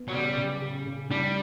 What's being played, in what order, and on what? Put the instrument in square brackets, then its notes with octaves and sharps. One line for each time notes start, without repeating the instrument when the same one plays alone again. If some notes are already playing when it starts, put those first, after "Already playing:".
Already playing: [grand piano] B3
[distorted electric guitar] F#3
[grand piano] C#3 [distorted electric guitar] G3
[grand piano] C#3
C#3
C#3
[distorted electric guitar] G3 [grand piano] D4